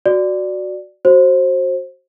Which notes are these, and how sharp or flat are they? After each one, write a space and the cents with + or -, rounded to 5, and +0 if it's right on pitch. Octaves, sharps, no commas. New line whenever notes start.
F#4 +0 D5 +0
F#4 +0 C5 +25